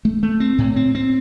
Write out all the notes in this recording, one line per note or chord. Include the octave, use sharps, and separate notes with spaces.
A3
A3
C4
A2
C4
C4